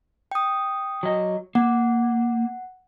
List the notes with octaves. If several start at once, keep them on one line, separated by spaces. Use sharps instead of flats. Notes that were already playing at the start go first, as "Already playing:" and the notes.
G5 D#6
F#3 D#5
A#3 F#5